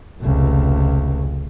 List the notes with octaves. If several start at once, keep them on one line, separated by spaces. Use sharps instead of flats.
F1 C#2